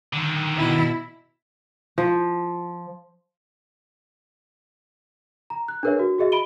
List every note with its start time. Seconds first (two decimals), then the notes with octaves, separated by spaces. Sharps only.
0.13 D3 D#3
0.58 B2 E4
1.98 F3
5.50 A#5
5.68 F#6
5.83 D4 G#4 A#4 B4 C#5 E5
5.99 F#4
6.18 F#4 G#4 D#5 E5
6.32 B5 D7 D#7 G7